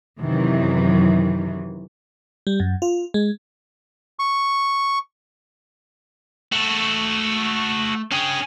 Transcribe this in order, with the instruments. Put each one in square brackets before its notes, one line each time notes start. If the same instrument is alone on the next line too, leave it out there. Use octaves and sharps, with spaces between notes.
[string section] F#2 C3 D#3 E3 F#3
[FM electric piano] G3
F#2
F4
G#3
[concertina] C#6
[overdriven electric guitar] A3 [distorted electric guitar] F#4 A4
[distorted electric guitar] C#4 G#4 [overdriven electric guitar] D4 G5